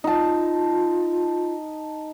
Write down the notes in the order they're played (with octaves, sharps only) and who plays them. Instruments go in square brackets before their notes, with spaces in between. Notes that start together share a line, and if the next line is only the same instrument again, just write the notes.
[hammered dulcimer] D#4 A5 [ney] F4